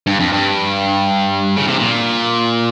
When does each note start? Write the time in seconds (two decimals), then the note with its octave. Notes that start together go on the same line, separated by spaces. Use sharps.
0.07 G2
0.19 F2
0.32 G2
1.57 C#3
1.68 C3
1.79 A#2